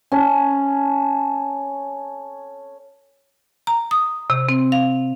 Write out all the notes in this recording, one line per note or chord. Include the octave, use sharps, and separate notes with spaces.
C#4 A4
A#5
D#6
C3
C4
F5